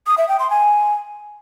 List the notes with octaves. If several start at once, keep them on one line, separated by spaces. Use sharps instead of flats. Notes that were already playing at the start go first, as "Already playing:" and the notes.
D#6
E5
G5
C6
G#5